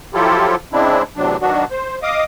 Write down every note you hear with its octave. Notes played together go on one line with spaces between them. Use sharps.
F3 F#3 E4 F4 G4 A4
C#3 G#3 C4 D4 E4
E2 A2 C3 F#3 D4
D#3 F#3 B3 D4 F#4
C5
D#5 F5 D6 D#6